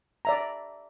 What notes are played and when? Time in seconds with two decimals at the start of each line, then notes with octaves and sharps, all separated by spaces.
0.25 D5 E5 A#5